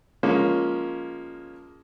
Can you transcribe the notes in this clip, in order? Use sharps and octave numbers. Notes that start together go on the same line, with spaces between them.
F3 G#3 A#3 C#4